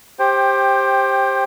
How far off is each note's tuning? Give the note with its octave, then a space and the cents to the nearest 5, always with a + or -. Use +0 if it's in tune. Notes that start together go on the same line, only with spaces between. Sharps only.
G4 +10 C5 +20 G5 +0